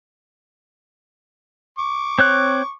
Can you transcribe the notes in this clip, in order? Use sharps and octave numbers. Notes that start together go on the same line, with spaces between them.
C#6 D6
C4 C#5 F#6